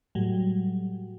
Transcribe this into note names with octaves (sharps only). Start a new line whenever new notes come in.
A2 F#3 G3